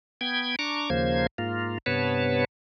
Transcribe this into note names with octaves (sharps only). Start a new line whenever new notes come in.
B3 G5 G#6
D4 A#5 C#6 D6
D#2 C#3 F3 A#3 C5 G#6
G#2 A#3 F4
G2 C3 B3 B4 C#5 A5